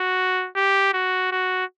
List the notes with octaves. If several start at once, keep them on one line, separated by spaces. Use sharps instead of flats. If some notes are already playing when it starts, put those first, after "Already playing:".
Already playing: F#4
G4
F#4
F#4